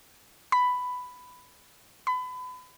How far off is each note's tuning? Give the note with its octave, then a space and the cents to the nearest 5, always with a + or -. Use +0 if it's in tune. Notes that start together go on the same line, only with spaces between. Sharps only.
B5 +10
B5 +30